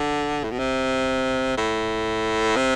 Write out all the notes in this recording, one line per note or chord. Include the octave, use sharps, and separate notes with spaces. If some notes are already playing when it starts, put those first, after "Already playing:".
Already playing: D3
A2
B2
C3
A2
C3